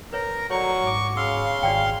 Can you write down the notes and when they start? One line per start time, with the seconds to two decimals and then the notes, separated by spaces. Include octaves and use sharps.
0.13 A#4 B4 C#5
0.51 F#3 A4 C#5 D5 A#5 C#6
0.84 G#2 D6
1.17 C#3 F5 C6 E6
1.63 G#1 F#4 D5 G5